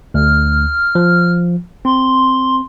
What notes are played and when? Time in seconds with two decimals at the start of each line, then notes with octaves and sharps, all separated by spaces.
0.14 D2 F6
0.95 F3
1.85 C4 C6